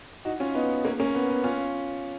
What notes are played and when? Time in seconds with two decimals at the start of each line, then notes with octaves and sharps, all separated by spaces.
0.25 D#4 F#4
0.40 C#4 F4
0.55 B3 D#4
0.85 A#3 C#4
1.00 A#3 C#4
1.15 B3
1.30 B3
1.44 C#4 F4